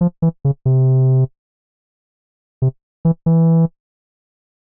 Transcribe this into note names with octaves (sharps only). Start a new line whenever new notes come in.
F3
E3
C#3
C3
C3
E3
E3